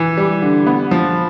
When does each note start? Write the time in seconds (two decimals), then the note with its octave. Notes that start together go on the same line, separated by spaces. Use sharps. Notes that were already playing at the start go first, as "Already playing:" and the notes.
Already playing: E3
0.17 G3
0.42 D3
0.67 B3
0.91 F3